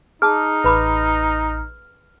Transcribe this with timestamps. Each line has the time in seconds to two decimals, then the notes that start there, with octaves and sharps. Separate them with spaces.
0.22 D#4 G#4 A5 D#6 F6
0.64 A1 B4 B5 D6